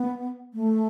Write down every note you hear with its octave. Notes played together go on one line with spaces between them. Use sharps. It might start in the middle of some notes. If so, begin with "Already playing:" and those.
Already playing: B3
A3